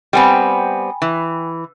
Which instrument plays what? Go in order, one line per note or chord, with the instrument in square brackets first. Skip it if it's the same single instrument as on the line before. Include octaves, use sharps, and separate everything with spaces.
[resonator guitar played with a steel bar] G3 B3 C4 [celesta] G5 G#5 B5
[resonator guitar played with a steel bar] E3